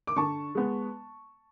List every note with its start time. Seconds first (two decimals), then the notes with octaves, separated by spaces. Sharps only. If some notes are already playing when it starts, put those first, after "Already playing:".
0.07 D6
0.16 D3 A5 C#6
0.55 G#3 B3